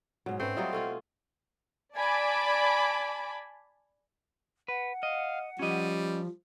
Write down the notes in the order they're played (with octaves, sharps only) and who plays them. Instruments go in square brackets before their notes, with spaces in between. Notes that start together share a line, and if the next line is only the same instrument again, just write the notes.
[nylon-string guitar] G#2 F#3 [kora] B2
[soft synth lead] G#2 [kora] A3 [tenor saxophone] C4 [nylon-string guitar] C#4 B4
[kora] F#3 G3 F4 [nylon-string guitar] D#5 E5 [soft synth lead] D#6
[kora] B2 C#4 F4 [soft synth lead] A4
[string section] D5 G#5 A5 B5 D6
[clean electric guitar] B4 [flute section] F#5
[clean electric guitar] D#5 [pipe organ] F5
[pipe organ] F3 [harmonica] G3 [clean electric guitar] C#4 D#5